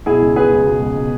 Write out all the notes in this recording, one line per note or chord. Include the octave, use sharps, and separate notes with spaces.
B2 E4 G#4
C#2
B2 G#4 B4
C#2
B2
C#2
B2